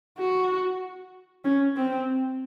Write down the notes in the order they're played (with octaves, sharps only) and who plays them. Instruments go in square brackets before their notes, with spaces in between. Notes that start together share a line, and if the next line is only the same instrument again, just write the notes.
[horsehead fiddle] F#4
C#4
C4